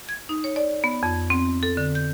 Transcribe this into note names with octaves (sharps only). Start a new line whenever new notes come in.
G#6
D#4
C#5
D5
B3
F2
C4
A4
D3
G6